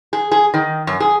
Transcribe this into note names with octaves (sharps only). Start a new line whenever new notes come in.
G#4
G#4
D#3
F#2
G#4